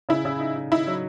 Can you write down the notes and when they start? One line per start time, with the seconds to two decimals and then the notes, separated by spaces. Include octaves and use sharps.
0.09 C#3 E4
0.25 C#3
0.40 D#4
0.56 D#4
0.72 D#4 E4
0.87 F#3